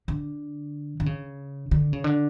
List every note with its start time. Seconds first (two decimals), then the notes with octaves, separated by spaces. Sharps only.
0.08 D3
1.00 D3
1.06 C#3
1.71 D3
1.93 C#3
2.04 D3